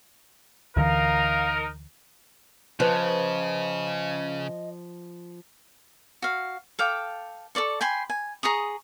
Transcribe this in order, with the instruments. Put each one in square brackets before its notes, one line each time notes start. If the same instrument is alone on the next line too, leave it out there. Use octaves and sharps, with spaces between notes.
[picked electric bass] D2 D3 E3 [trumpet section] D#4 A#4 [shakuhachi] F5
[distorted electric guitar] C#3 [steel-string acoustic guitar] F3 [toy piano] B4 C5 [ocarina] D#5
[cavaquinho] F#4 F5
A4 F5 G5 D6
A4 C#5 D5 C#6
G5 G#5 B5 C6
G#5
G#4 A#5 C#6 D#6